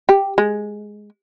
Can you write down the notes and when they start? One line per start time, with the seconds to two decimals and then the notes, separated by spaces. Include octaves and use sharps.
0.09 G4
0.38 G#3